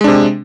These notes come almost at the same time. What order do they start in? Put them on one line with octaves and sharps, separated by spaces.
G#3 D4 C3